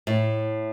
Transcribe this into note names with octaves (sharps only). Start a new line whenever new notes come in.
A2